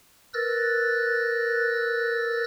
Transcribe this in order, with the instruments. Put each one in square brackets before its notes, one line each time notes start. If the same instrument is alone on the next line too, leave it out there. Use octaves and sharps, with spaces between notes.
[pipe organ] A#4 B4 E6 F#6 A6 A#6